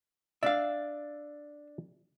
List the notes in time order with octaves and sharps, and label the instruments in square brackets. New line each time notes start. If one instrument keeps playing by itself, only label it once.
[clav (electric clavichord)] D4 D5 [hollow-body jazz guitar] E5 F5